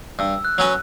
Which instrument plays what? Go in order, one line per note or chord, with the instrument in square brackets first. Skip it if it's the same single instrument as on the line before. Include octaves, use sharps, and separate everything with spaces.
[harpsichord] G2 [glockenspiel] E6
[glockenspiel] F#6
[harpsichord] F#3 C#4 F#4 B4